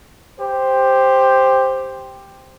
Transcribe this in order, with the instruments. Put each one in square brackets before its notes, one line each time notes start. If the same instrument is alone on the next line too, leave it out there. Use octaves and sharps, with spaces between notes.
[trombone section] G4 C5